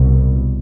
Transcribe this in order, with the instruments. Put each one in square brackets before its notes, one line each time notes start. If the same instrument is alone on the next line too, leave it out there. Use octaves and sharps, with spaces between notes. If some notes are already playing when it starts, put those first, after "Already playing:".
Already playing: [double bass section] C2 B2